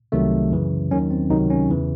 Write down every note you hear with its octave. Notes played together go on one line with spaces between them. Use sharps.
C2 C3 D#3 F#3 A3
F#2 C#3 E3
D#2 D#3 F#3 C#4
C4
C#2 C3 D#3 F#3 D#4
C#4
E2 C#3 E3